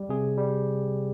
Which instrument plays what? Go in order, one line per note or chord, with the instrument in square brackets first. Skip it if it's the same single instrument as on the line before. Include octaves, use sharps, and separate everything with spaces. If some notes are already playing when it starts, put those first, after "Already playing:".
Already playing: [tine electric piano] G3
C3 G#4
G3